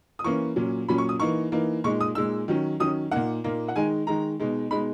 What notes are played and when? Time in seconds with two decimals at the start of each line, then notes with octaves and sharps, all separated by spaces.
0.19 D#6
0.24 E3 A#3 C#4 C#6
0.56 A#2 F#3 C#4
0.88 A#2 F#3 C#4 B5
0.98 C#6
1.09 D#6
1.20 E3 A#3 D#4 C#6
1.52 E3 A#3 D#4
1.84 A#2 G#3 D#4 C#6
2.01 D#6
2.15 A#2 G#3 D#4 E6
2.48 D#3 F#3 C#4
2.80 D#3 F#3 C#4 D#6
3.11 A#2 A#3 D#4 F#5
3.44 A#2 A#3 D#4
3.68 F#5
3.76 D#3 G#3 D#4 G#5
4.07 D#3 G#3 D#4 A#5
4.40 B2 G#3 D#4
4.71 B2 G#3 D#4 B5